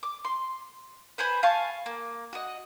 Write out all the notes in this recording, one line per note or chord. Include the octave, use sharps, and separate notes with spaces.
D6
C6
B4 C5 G#5 B5
F5 G#5 A5 C#6
A#3
F#4 D#5